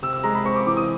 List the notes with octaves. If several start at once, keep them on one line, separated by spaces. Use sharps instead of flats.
C3 E6
E6
G#3 A#5
B5
C4 C#6
D6
E3 D6
D#6